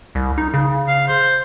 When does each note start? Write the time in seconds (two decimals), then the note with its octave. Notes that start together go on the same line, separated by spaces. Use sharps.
0.15 C2
0.38 D#4
0.54 C#3
0.88 F5
1.08 C5